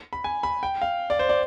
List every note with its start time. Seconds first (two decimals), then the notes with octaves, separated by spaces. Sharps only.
0.13 B5
0.24 G#5
0.43 B5
0.63 G5
0.82 F5
1.10 D5
1.19 C5
1.29 D5